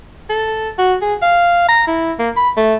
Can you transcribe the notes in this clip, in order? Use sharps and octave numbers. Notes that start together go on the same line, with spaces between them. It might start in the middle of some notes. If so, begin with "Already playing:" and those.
A4
F#4
G#4
F5
A#5
E4
A#3
B5
A3